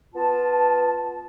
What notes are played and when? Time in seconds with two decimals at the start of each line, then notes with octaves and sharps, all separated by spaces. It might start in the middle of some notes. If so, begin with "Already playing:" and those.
0.14 B3 F4 A5